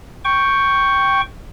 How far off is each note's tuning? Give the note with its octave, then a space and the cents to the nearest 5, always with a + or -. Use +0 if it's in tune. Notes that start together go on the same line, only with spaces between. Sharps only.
G5 +0 C#6 +0